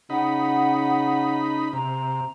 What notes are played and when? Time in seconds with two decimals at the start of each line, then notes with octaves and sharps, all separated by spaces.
0.10 C#3 D#4 F#5 B5
1.73 C3 A#5